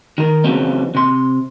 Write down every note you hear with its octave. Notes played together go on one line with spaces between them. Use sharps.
D#3 A#4
C#3 E3 F#3 B3 C4 D#4
C3 C6